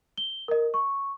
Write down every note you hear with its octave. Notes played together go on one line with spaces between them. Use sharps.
G7
A#4 D#5
C#6